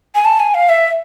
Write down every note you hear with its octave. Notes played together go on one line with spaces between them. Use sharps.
G#5
A5
G#5
F5
E5